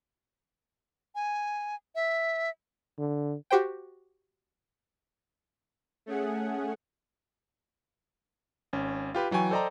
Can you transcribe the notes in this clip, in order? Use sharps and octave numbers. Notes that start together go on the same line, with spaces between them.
G#5
E5
D3
F#4 G4 C5 G5
A3 C#4 G#4 F#5
G#1 C#4
F4 G4 B4
E3 F#3 G5 G#5 C#6
A4 C5 D5 D#5 G5 A#5